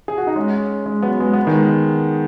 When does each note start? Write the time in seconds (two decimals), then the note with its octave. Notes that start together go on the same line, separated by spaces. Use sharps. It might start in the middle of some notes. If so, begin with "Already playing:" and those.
0.08 G#4
0.18 F#4
0.27 D#4
0.36 G#3 C#4
0.86 G#3 C#4
1.02 F#3 B3
1.20 G#3
1.33 B3
1.47 D#3 G#3